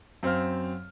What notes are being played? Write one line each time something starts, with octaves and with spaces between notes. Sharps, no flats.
F#2 C4 C5 F5 F6